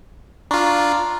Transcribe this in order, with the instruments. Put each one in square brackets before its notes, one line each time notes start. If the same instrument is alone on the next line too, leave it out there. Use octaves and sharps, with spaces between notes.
[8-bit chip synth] D4 F4 [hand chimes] A#5 C#6